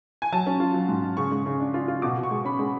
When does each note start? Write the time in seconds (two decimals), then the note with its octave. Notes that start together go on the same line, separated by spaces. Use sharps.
0.22 G#5
0.32 F#3 A5
0.46 C#4
0.60 F4
0.74 F#3
0.88 G#2
1.03 G#2
1.17 C#3 C#6
1.31 G#3
1.46 C#3
1.60 D4
1.74 F4
1.88 F4
2.02 B2 D6
2.17 B2
2.23 C#6
2.31 G#3
2.45 C#4 B5
2.59 G#3